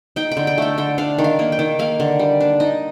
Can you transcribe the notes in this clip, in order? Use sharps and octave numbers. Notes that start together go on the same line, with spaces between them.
D#4 G5
G5
D3
G5
A3 G5
D3 G5
D4 F5
D#3
F5
A#3
G5
D#3
A#3 F5
D3
G3
D4
D#4 D#5